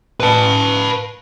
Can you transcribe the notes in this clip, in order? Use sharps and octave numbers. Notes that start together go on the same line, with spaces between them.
B4 A5